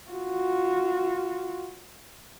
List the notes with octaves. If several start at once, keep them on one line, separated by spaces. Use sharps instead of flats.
F4 F#4